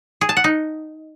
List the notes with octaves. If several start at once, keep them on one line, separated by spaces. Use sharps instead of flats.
G#4
A5
F#5
D#4